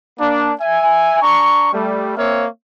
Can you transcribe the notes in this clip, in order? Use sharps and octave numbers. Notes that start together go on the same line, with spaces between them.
A#3 D4
E5 G#5
D4 A#5 C#6
G3 A3
A#3 C4 C#5 E5 F5